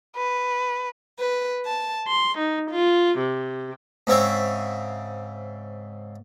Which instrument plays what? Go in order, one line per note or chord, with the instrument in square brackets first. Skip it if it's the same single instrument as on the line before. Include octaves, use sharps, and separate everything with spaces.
[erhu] B4
[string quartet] B4
A5
C6
D#4
F4
C3
[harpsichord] G#2 C#3 C4 C#5 E5